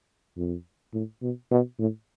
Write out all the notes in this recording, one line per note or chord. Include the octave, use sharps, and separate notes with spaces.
F2
A2
B2
B2
A2